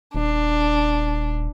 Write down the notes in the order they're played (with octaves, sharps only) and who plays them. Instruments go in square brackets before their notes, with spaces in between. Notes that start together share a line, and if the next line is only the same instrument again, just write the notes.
[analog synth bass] D#1 [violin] D4